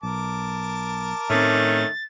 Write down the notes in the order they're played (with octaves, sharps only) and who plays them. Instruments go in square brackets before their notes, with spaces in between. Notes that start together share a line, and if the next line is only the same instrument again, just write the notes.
[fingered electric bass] B1 [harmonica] A#4 A5 D6
[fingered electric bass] A2 C4 [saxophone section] D#3 A3 C#4 [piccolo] A6